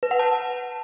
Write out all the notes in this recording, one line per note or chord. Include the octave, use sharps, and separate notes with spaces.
B4
F#5
A5